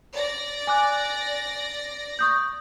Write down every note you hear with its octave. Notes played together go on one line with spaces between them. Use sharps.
D5 A#6
G#5 D6 F#6
C#6 D#6 G6